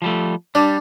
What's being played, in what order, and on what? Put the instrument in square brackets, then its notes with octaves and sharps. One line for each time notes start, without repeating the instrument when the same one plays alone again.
[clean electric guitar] F3 G3 A3
[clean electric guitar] G3 [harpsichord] D4